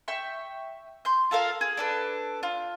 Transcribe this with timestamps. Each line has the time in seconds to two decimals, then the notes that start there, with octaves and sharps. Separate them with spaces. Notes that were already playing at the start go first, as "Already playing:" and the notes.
0.08 E5 G5 C#6
1.05 C6 G6
1.31 F4 A4 A#4 F5
1.61 G#4
1.77 D4 A4 B4
2.43 F4